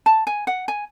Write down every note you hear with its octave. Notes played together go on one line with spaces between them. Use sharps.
A5
G#5
F#5
G#5